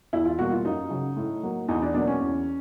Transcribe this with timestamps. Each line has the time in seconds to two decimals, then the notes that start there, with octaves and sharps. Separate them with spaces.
0.13 E2 E4
0.25 F4
0.39 B2 G3 A#3 F#4
0.52 F4
0.64 F#2 D#4
0.90 C#3 F#3
1.17 A2
1.43 F#3 A#3
1.68 E2 D#4
1.82 D4
1.94 B2 F#3 A#3 D4
2.07 C#4
2.21 E2